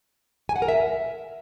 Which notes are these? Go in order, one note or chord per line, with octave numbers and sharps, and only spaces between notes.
G#5
F#5
A#4
E5